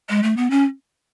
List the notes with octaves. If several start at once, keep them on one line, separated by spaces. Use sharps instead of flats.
G#3
A3
B3
C#4